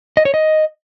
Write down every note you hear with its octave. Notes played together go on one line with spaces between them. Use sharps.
D#5
C#5
D#5